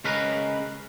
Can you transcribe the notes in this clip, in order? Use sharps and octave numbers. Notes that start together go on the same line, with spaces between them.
C#3 G#3 C#4 A#4 B4